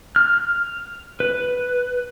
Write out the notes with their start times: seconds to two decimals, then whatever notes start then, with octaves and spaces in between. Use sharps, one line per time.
0.16 F6
1.20 B4